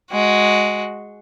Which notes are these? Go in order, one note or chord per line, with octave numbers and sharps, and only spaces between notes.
G#3 F#4